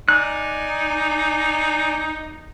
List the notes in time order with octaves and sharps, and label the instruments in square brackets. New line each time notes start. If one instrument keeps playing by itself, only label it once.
[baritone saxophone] D#4 [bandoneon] D5 G#5 [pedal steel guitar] F#6